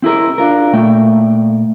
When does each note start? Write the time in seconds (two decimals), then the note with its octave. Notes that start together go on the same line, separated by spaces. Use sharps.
0.02 C4 E4 G#4 A#4
0.38 D4 F4 A#4
0.73 A#2 A3 G5